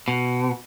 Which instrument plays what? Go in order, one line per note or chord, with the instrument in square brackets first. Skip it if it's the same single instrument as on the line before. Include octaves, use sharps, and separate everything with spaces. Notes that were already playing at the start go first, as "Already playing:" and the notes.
[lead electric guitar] B2